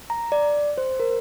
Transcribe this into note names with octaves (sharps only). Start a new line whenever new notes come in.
A#5
D5
C5
A#4